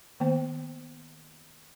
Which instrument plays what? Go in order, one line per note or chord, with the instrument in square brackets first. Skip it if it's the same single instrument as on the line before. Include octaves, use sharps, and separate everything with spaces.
[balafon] D#3 A#3 B3 C5